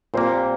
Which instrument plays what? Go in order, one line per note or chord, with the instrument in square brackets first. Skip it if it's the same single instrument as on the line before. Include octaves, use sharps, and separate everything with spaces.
[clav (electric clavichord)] A#2 G3 A#3 [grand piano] C4 C5